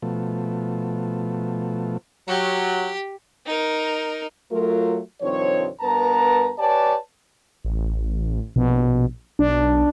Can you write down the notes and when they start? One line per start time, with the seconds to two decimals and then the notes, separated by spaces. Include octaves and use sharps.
0.02 B2 F3 A3
2.28 F#3 G4
3.46 D#4 A#4
4.52 F#3 A3 F4 A#4
5.22 C2 G2 D#3 F3 C4 C#5
5.81 G2 B3 A#4 B4 A5 A#5
6.58 G4 B4 C#5 D5 G#5 A5
7.64 A1
8.56 A#1 B2
9.39 B1 D4